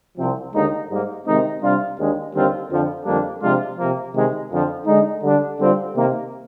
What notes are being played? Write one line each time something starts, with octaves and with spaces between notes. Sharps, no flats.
C2 C3 F3 C4
D#2 D3 G#3 D#4
G#2 G3 A#3
C3 D#3 G#3 C4 D#4
C3 G3 D4 F4
D#2 D#3 G#3 D4
D#2 D3 G3 C4 F4
F2 D3 F3
F2 D3 G3 A#3 D4
C3 F3 G#3 D4 F4
C3 F3 A#3
C3 D#3 G#3
F2 D3 F3
D3 G#3 D#4
D3 G3 D4
D3 G3 C4 F4
C3 D#3 A#3